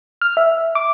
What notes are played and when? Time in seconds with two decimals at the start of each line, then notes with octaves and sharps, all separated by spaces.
0.21 F6
0.37 E5
0.75 D6